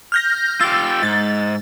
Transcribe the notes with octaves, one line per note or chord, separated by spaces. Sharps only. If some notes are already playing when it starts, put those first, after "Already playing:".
F6 G6 A#6
F4 G4 E6 A6
G#2 A6